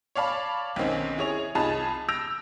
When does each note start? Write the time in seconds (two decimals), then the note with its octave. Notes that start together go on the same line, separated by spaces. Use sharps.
0.15 C#5 D5 F5 A5 B5
0.76 B1 D#3 C4 C#4
1.17 E4 G#4 C#5 F7
1.55 C2 D#4 F4 G#4 A5 B5
2.09 E6 G6 A#6 D7 F7